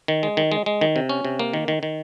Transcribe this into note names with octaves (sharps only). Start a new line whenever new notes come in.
D#3
G#3
D#3
G#3
G#3
D#3
C3
C#4
C3
A#3
D#3
D#3
D#3